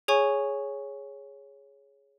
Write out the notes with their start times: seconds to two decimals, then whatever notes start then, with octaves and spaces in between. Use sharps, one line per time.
0.08 G#4 C#5 G#5 C#6